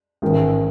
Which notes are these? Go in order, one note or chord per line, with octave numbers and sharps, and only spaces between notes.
A1 G#2 D#3